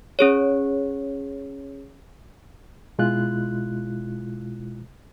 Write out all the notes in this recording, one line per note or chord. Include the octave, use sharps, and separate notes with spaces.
C#4 G#4 C#5
B2 G#3 E4 F4 F#6